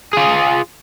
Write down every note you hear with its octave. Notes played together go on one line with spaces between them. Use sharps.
F4 G#4